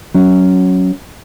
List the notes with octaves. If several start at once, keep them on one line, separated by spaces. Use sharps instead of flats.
F#3 C#4